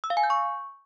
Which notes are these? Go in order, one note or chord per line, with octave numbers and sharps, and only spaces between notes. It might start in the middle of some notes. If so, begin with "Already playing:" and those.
E6
F5
G#5
G6
C#6